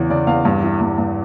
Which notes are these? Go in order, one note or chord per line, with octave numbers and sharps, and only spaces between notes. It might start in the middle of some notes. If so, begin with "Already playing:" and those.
Already playing: E2 C#3 E3
C#3 D5
E2 F5
G2
E3
G2
G2